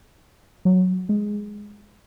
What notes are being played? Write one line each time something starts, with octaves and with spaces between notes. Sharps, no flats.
F#3
G#3